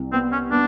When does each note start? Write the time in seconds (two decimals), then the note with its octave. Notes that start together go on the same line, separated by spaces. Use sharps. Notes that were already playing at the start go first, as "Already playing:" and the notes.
Already playing: C2
0.12 B3 C4
0.32 C#4
0.51 B3 D4